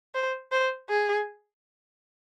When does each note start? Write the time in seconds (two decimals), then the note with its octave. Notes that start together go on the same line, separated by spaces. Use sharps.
0.15 C5
0.52 C5
0.90 G#4